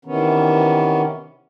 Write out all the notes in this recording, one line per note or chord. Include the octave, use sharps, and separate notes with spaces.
C3 D#3 E3 B3 C#4